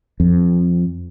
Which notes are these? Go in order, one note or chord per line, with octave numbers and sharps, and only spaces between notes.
F2